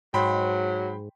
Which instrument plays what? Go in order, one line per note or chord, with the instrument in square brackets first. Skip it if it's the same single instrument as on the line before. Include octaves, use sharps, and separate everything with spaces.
[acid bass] G#2 [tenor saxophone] F#3 [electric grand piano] G5 B5 C6